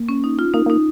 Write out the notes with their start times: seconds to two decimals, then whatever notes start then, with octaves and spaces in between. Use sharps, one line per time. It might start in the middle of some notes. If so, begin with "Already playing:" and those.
Already playing: A#3
0.09 C#4
0.24 D#4
0.39 F4
0.54 A#3 D#4
0.66 A#3 D#4